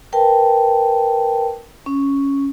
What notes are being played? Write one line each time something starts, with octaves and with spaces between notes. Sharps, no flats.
A#4 B4 G5 A5
C#4